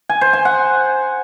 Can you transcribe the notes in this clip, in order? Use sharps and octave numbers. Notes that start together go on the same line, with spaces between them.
G#5
C5
G#5
F#5